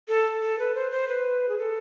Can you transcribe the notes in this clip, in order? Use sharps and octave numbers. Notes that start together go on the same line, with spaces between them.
A4
A4
B4
C5
C5
B4
G#4
A4